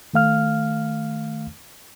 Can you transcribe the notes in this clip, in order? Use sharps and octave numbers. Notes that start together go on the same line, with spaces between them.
D#3 A3 F5 F6